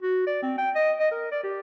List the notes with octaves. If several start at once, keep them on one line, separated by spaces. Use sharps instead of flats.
F#4
D5
C4
G5
D#5
D#5
A#4
D5
G4